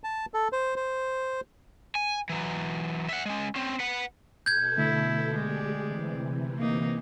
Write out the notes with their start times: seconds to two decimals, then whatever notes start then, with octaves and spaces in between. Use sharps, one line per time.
0.04 A5
0.34 A4
0.52 C5
0.76 C5
1.95 G#5
2.29 E3 F#3
3.09 E5 F#5
3.26 G#3 C#4
3.56 C4 C#4
3.80 B4 F#5
4.46 B2 A4 G6 G#6
4.78 D3 A3 E4
5.36 G#3 G4 G#4 D5
5.83 C3 E3
6.58 A#3 D#4